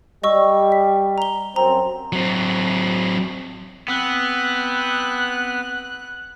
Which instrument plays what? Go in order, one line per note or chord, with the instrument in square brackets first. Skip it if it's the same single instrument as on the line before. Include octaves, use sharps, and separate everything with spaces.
[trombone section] G3 [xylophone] D#5 C#6 E6
[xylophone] B6
A#5 G7
[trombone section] F#2 C4 [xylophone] A#5
[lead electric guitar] F#3 C4
[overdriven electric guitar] B3 [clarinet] C4 [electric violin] F#6